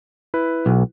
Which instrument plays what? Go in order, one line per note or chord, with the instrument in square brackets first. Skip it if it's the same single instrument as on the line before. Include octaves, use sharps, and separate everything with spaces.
[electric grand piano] E4 B4
[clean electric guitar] B1